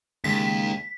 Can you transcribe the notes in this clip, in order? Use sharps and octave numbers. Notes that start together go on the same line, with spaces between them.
D#2 C#3 G#3 B6